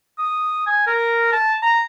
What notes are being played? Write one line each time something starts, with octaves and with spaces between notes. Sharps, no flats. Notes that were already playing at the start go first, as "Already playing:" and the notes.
D#6
G#5
A#4
A5
A#5